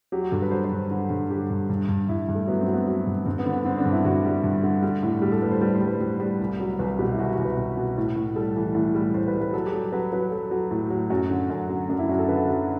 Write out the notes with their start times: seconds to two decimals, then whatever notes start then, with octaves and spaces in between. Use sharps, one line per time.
0.12 F#3 G4
0.22 F#4
0.32 G2 A4
0.42 B4
0.51 F#3 C5
0.64 C5
0.72 G2
0.91 D3
1.10 G2
1.30 D3 G4
1.50 G2
1.70 G2
1.89 G2
2.09 G2 E4
2.29 G2
2.35 A3
2.47 F#3 B3
2.61 C4
2.67 F#3
2.74 B3
2.88 F#3
3.07 G2
3.26 G2 C4
3.39 B3
3.45 D3
3.53 B3
3.65 D3 C4
3.78 D4
3.85 G2
3.92 E4
4.04 G2 F#4
4.25 G3
4.44 G2
4.63 D3
4.82 G3
5.03 A2
5.22 G3 G4
5.32 A4
5.42 G3 B4
5.51 C5
5.61 G3 B4
5.74 C5
5.81 G3
5.87 B4
6.01 G3
6.20 G3
6.41 C2
6.60 F#3
6.79 C2 B4
6.99 B2 G4
7.12 E4
7.18 C2 F#4
7.32 F#4
7.38 C2
7.45 B4
7.58 C2
7.77 B2
7.97 A2
8.16 A2
8.36 G3 A4
8.56 E3
8.75 A2
8.95 G3
9.14 A2 C5
9.28 B4
9.34 G3
9.41 B4
9.53 F#3 A4
9.67 G4
9.73 F#3
9.92 F#3 B4
10.13 F#3 B4
10.32 F#3 A4
10.51 F#3
10.71 A2
10.90 F#3
11.10 F#2 F#4
11.30 D3
11.50 F#2
11.69 F#3
11.90 F#2 D4
11.99 E4
12.09 F#2 F#4
12.19 A4
12.28 D3 B4
12.48 F#3